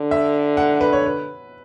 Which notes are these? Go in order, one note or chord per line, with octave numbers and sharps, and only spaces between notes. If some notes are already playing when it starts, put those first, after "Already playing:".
Already playing: D3
E5
F#5
B4
C#5
B4